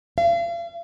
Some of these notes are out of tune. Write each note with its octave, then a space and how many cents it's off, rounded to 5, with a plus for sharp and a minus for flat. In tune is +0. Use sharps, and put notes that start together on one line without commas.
F5 -40